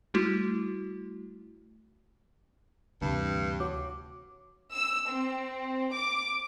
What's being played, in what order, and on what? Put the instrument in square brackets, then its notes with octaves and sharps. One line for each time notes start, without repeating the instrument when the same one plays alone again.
[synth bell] G3 A3 E4 F#4
[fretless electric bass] D2 C3 E3 [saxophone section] G2
[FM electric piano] F#4 C#5 D6
[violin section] E6
C4
D6